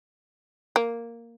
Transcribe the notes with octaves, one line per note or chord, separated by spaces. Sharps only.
A#3